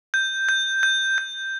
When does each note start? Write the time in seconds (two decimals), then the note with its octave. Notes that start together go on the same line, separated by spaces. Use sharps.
0.14 G6
0.49 G6
0.83 G6
1.18 G6